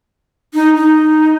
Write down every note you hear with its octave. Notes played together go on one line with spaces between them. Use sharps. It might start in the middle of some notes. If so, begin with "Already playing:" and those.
D#4
D#4